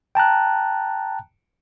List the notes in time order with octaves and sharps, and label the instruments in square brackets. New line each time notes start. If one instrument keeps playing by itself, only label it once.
[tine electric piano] G5 A5 A#5 F#6